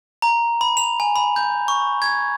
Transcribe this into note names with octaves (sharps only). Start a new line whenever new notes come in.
A#5
B5
F7
G#5
B5
G6
C#6
G#6